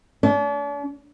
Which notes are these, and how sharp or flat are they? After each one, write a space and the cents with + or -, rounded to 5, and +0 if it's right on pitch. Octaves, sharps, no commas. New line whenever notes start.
D4 -45